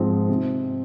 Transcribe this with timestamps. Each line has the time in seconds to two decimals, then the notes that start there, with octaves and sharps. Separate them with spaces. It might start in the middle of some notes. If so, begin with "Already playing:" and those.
Already playing: G#2 F3 G#3 C4
0.29 C3